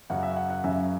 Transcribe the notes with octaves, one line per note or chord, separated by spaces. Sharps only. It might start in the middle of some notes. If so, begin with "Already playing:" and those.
F#2 C#3 F#3 F#5
E5
F#5
F#5
F#2 C#3 F#3 E5